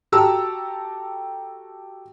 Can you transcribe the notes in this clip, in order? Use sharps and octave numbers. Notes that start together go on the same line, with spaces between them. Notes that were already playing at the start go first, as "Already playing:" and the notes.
F#4 G4 A4 A5 A#5 E6